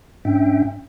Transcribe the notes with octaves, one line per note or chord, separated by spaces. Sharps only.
G#2 C#4 D4 E5 G5